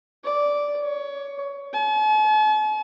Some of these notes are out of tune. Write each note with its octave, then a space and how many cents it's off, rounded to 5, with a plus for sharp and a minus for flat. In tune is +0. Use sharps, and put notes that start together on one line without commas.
D5 -10
C#5 +20
A5 -45